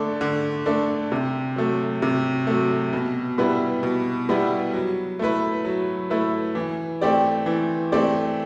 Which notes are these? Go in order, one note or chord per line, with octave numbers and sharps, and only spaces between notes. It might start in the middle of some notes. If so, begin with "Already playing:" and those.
Already playing: D3 A3 D4 A4
D3
A3 D4 A4
C3
F#3 A3
C3
F#3 A3
B2
G3 B3 E4 B4
B2
G3 B3 E4 B4
F#3
A3 E4 B4
F#3
A3 E4 B4
E3
A3 C4 G4 D5
E3
A3 C4 G4 D5